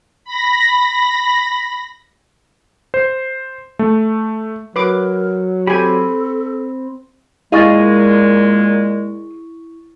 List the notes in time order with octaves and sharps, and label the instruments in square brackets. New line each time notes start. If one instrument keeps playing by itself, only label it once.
[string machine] B5 A#6
[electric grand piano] C5
A3
[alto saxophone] F#3 [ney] A#4 [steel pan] B4 D6
[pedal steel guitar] C4 B5 [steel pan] G4 G#5 [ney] A4
[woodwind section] A#2 G#3 [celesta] E4 C#6 A6 [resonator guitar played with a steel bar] G#4 D#5 F5